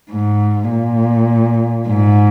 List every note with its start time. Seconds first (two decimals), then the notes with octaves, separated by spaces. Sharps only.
0.11 G#2
0.70 A#2
1.88 G#2